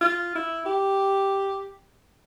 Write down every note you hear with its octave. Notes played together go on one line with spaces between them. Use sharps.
F4
E4
G4